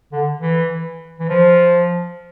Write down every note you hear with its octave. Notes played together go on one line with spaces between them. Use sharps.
D3
E3
E3
F3